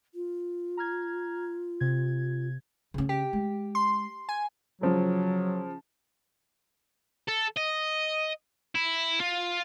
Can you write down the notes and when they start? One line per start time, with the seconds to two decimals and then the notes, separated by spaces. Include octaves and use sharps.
0.14 F4
0.77 A#5 F6 G#6
1.80 C3 G#6
2.94 C#3 C#4
3.09 G4
3.33 G#3
3.75 C6
4.29 G#5
4.81 C#3 F3 F#3
7.28 A4
7.57 D#5
8.75 E4
9.19 F4